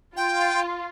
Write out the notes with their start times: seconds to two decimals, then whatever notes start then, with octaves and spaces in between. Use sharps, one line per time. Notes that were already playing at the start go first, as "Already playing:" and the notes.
0.17 F4 G5